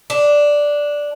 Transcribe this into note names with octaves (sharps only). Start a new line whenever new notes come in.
D4